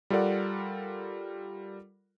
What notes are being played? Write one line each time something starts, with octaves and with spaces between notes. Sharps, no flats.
G3 F4 A4 A#4 D5 F#5